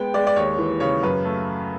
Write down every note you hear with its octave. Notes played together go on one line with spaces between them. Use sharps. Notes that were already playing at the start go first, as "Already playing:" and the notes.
Already playing: G#3 B3 G5
G#3 D5
D5
D#2 C#5
E3
C#3 C#5
F#2 B4
A3